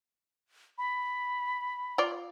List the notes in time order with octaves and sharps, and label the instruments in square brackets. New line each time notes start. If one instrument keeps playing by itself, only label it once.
[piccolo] B5
[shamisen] F4 D5